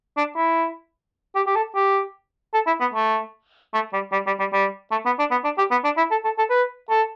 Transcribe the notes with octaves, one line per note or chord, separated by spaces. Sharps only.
D4
E4
G4
G4
A4
G4
A4
E4
B3
A3
A3
G3
G3
G3
G3
G3
A3
B3
D4
B3
D4
G4
B3
D4
E4
A4
A4
A4
B4
A4